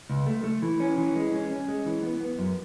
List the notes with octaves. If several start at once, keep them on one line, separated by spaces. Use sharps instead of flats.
C#2
A3
A3
E3
C#4
E3
G#3
C#4
C#4
G#3
E3
B3
B3
F#2